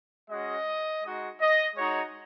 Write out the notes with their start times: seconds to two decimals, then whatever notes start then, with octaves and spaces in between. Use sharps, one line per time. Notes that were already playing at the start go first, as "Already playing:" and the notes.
0.29 G#3 C#4 F#4 D#5
1.03 G#3 D#4 F#4
1.40 D#5
1.76 G#3 D#4 F#4 C#5